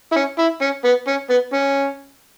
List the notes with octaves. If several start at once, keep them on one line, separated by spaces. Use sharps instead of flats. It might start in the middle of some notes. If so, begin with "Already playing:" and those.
E4
C#4
E4
C#4
B3
C#4
B3
C#4